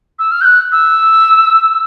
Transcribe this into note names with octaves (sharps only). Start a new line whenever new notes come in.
E6
F6
G6
F#6
E6